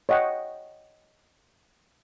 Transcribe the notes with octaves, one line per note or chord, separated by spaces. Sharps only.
C#5 D#5 F#5 G5